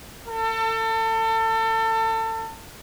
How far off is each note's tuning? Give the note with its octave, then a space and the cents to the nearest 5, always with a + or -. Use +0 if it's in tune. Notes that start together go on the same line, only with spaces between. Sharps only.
A4 +30